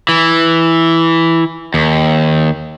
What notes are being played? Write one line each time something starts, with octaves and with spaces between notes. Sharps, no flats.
E3
D#2